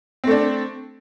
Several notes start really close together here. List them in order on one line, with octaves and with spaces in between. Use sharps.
C4 A3 D4